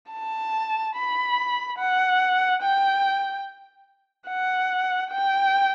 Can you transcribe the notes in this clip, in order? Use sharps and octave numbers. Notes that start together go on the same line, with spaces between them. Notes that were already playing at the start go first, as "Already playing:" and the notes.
A5
B5
F#5
G5
F#5
G5